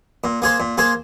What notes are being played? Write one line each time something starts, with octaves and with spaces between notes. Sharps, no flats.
A#2
A#3 G#4 C5
A#2
A#3 G#4 C5